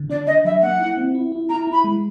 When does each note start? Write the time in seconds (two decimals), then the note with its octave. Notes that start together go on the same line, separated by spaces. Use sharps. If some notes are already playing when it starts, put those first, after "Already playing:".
Already playing: D3
0.10 D4 D5
0.27 D4 D#5
0.45 F#3 E5
0.62 A#3 F#5
0.80 E4
0.97 C4
1.15 E4
1.32 E4
1.50 E4 A#5
1.67 E4
1.72 B5
1.84 G#3